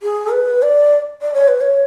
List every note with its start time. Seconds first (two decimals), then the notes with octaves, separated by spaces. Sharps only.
0.02 G#4
0.32 B4
0.62 D5
1.22 D5
1.34 C#5
1.48 B4
1.61 C#5